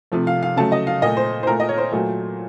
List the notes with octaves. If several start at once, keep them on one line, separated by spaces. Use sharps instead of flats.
C3 F3 A3
F5
F5
C#3 F#3 A3 A5
D#5
F5
A#2 A3 D#5
C5
C5
A#2 A3 A#4
D#5
C#5
C5
A#2 F#3 A3